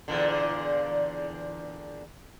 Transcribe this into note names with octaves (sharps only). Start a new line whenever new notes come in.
E2 A#2 D3